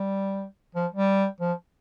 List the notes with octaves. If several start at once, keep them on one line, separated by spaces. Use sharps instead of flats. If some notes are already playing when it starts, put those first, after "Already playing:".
Already playing: G3
F3
G3
F3